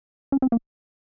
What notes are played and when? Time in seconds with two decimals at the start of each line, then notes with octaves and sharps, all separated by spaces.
0.32 C#4
0.42 C4
0.52 A#3